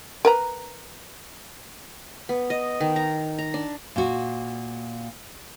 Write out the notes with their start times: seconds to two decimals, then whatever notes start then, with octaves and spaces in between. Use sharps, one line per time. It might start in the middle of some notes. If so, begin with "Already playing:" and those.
0.25 A#4 B4 A#5
2.29 B3
2.50 D#5
2.80 D#3
2.96 A#5
3.38 A#5
3.54 D4
3.96 A#2 F#4